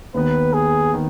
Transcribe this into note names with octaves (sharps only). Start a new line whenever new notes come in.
D#2 D#3 B3 B4
G#4
D#3